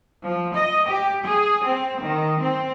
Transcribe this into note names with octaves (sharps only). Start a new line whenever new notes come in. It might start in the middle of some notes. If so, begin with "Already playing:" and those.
F3
D#5
G4
G#4
C4
D#3
C4